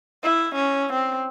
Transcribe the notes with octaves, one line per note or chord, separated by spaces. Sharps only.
E4
C#4
C4